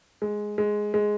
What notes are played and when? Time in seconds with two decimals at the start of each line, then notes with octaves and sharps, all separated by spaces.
0.22 G#3
0.58 G#3
0.94 G#3